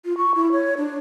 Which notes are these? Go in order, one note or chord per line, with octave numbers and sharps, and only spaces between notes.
F4
C#6
E4
C#5
D4